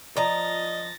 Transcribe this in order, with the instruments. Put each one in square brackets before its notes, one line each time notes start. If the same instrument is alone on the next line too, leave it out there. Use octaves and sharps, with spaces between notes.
[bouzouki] F3 A#5 [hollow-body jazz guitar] D5 [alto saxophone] D#5 [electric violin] A6 A#6